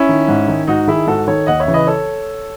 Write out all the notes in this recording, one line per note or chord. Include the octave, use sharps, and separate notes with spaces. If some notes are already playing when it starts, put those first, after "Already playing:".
Already playing: C#4 E4
D#3
G#2
D#3
G#2 D#4 F#4
D#3 E4 G#4
G#2 F#4 A4
D#3 A4 C#5
D#2 D#5 F#5
C#5 E5
C#3 E3
B4 D#5
A4 C#5